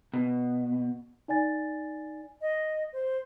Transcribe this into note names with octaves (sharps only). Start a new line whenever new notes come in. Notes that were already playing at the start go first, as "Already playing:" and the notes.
B2
D#4 D5 G#5 A6
D#5
C5